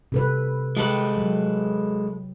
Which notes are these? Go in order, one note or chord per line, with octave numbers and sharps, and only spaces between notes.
C3 A4 B4
G#3 G4 A4 B4
F#3